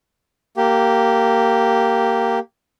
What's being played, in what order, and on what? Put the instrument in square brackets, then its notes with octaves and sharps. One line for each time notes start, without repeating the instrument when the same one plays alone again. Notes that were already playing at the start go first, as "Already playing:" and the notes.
[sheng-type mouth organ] A#3 G4